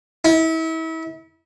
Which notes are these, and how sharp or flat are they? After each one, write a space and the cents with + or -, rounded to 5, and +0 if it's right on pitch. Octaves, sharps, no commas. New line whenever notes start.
E4 -35